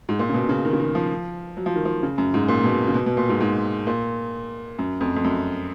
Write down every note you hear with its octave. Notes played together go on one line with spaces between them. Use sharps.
G#2
A#2
C#3
B2
C#3
D#3
C#3
D#3
F3
F#3
F3
D#3
F3
C#3
F#2
G#2
A#2
B2
C#3
B2
B2
A#2
G#2
G#2
A#2
F#2
F2
F2
F#2